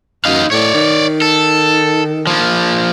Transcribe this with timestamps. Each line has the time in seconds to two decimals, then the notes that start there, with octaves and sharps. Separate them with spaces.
0.25 F#2 D#4 F5
0.52 A2 C#5 D5
0.74 D#3
1.22 A4
2.27 F3 A#3